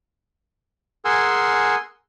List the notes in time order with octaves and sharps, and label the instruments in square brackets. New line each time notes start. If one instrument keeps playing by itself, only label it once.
[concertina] G#4 A#4 F#5 G#5 C6 E6